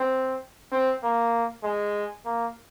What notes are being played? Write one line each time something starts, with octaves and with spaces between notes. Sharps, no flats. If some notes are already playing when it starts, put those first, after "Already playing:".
Already playing: C4
C4
A#3
G#3
A#3